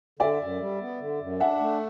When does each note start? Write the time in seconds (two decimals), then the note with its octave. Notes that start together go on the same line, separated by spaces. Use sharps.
0.19 D3 D5 E5
0.40 F#2
0.60 G3
0.80 B3
1.00 D3
1.20 F#2
1.40 D4 E5 F#5
1.60 A3